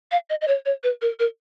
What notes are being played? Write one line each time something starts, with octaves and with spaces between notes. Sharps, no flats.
F5
D#5
D#5
C#5
C#5
B4
A#4
A#4